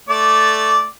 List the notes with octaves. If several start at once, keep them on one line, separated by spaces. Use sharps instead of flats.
A3 D5 D6